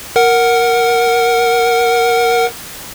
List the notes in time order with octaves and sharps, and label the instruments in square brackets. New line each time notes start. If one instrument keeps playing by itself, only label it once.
[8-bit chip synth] A#4 F#5